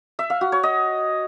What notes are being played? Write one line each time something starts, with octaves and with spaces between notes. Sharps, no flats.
E5
F5
F#4
C#5
D#5